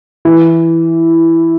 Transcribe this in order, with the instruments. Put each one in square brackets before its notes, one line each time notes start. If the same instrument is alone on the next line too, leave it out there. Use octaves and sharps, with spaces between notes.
[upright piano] E3 [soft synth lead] E4